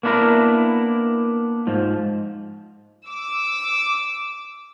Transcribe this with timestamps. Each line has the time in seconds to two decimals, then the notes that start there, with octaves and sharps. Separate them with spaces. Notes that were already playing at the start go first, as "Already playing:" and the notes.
0.03 A#3 B3 D4 E4 A#4
1.67 G#2 F3
3.06 D6 E6